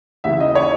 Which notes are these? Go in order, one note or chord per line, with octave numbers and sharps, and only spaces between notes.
D#2 C#3 E3 E5
D#5
C#5